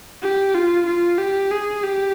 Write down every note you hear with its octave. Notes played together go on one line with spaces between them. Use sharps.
G4
F4
F4
G4
G#4
G4